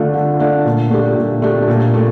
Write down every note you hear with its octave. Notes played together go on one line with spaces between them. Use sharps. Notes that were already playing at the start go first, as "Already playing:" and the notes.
Already playing: D3 A3 D4 F4
D3
A3 D4 F4
A#2
A3 D4 G4
A#2
A3 D4 G4
A#2
A3